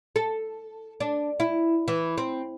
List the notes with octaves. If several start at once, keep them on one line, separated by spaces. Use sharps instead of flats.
A4
D4
E4
E3
C4